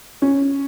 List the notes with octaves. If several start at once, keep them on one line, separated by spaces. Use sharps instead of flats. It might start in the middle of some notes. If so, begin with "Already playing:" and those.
C#4